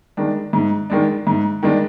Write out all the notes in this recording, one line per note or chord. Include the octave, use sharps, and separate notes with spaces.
D#3 G#3 D4
G#2
D#3 G#3 D4
G#2
D#3 G#3 D4